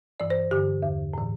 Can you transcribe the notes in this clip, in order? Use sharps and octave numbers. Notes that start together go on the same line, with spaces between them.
G2 E3 D5
C5
G2 D3 G4
E2 D3
A2 E3